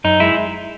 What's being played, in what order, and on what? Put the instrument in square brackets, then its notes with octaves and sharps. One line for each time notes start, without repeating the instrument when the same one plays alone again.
[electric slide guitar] F#2 D#4
G#3 E4